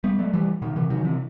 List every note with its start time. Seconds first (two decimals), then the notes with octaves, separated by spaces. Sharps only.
0.04 G3 B3
0.19 F#3 A3
0.33 E3 G3
0.62 B2 D#3
0.76 C3 E3
0.90 D#3 F#3
1.04 C3 E3